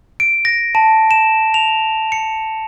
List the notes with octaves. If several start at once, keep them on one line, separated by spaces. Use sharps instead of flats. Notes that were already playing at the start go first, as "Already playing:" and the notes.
D7
A#6
A5
E7
F7
C#7